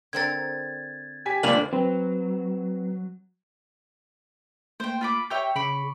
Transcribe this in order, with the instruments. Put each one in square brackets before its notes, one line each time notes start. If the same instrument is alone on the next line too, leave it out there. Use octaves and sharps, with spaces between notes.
[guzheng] D3 C4 A#4 [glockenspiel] G#6 A6
[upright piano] G4 G#5 B6
[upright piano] F1 C#2 F7 [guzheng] D3 C4 [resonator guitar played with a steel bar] A#3 D4 [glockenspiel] F#7
[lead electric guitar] F#3 [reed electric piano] C4 B4
[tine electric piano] A3 A#3 [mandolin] C5 G5
[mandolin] F4 B5 D6
[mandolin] G4 C#5 G5 [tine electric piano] E5 E6 G6
[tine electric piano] C#3 [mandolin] B5 C#6 D6